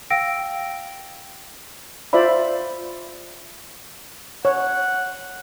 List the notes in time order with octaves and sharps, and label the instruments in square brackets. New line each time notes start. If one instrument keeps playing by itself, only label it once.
[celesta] F5 G5 E6 A#6 D7
[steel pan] F4 C5 D5 E5 B5
[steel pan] C#5 [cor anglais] F#5